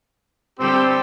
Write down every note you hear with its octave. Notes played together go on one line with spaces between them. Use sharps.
D3 G3 C4 G4 A4